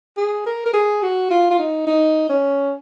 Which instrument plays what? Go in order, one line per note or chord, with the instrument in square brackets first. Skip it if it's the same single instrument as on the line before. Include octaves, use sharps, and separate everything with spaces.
[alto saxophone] G#4
A#4
A#4
G#4
F#4
F4
F4
D#4
D#4
C#4